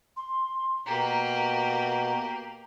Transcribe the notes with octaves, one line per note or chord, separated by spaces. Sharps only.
C6
B2 A#3 G4 A#5